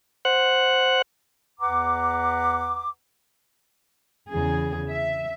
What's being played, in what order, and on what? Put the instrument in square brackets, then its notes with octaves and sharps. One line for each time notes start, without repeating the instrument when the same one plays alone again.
[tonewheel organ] C5 F#5 F#6
[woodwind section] E2 B4 F#5 A#5 D6
[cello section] E2 C#3 E3 G#4
E5